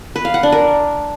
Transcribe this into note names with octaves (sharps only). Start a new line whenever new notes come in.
B4
F5
F#5
D4
A#4